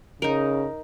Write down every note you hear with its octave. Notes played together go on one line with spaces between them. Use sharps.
C#3 D#4 A#4